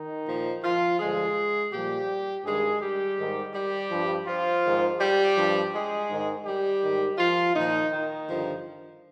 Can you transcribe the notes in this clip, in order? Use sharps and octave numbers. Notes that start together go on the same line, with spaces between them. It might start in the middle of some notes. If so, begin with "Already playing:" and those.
Already playing: D#3 D#4
A#2 F3
F3 F4
G2 D3 F3 G#3 G#4
A#2 F3 G3 G4
G2 D#3 G#3 G#4
G3 G4
G#2 D#3
G3 G4
G2 F3
F3 F4
G#2 D#3
G3 G4
G2 F3
G#3 G#4
G#2 D#3
G3 G4
G#2 D#3
F3 F4
A#2 D#3 F3 D#4
D#3 D#4
G2 D3 F3